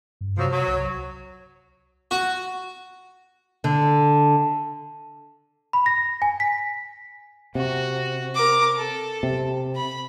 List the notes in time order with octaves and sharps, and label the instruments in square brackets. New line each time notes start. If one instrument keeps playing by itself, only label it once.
[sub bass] G2
[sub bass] C3 [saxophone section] F3 F#3
[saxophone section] F#3
[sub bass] C2
[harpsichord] F#4
[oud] D3
[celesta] B5
A#6
G#5
B6
[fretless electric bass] C3 [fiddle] F#4
[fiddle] A#4 D6
A4
[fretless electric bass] C3
[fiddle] B5